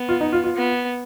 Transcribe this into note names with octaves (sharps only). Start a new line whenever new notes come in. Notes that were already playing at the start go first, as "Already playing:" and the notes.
Already playing: B3
F4
D#4
F4
F4
B3